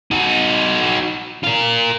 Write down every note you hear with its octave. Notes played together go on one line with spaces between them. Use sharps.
D#4 F#4
F4 A#4